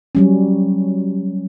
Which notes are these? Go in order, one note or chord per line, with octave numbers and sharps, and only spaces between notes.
F#3 G3 C#4